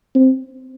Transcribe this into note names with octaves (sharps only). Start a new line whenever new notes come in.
C4